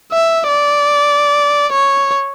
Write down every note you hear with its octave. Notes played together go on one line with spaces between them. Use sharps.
E5
D5
C#5